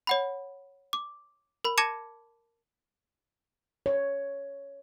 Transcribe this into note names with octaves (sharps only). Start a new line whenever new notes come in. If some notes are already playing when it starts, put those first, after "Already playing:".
C#5 F#5 B5
D6
A#4 B5
A5 D6 G#6 A#6 C#7 E7
C#5